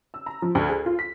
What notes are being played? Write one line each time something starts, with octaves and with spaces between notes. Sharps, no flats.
E6
A#5
F3
D2
G#4
F4
B6